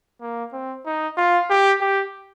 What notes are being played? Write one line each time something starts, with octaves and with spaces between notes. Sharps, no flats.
A#3
C4
D#4
F4
G4
G4